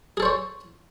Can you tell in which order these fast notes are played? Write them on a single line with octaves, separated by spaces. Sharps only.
G#4 A4 C5 C#5